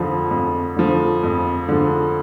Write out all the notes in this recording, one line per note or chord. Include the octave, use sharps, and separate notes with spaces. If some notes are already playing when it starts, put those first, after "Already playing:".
Already playing: F2 D3 F3
F2
D3 F3
F2
D3 F3